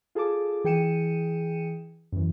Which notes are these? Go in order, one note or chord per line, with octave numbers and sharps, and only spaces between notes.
F4 G#4 A4 A5 D6
E3 G#4 G5 C#7 D#7 E7
F#2 E3